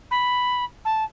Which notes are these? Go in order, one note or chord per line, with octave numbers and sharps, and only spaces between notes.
B5
A5